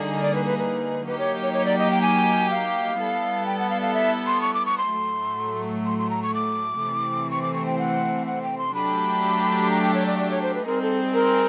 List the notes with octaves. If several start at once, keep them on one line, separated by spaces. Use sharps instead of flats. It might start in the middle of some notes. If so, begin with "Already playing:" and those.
Already playing: D3 G3 A#3 D#4 G#4
D5
B4
B4
B4
F#3 A#3 D#4 G4 B4
C#5
C#5
C#5
D5
D#5
G5
G#5
F5
G3 B3 E4 A4
G5
F#5
F5
F5
E5
C6
C#6
D6
C#6
C6
A2 F#3 A3
C6
C6
A#5
C#6
D6
C3 E3 A3 C4
C#6
D6
C#6
G5
F#5
F#5
G5
C6
F#3 A3 D4 G4 B5
A#5
G5
C#5
D5
D5
C#5
C5
B4
G3 C4 D#4 G#4 A#4
A4
A#4